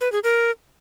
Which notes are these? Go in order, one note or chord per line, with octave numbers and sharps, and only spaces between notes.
B4
G#4
A#4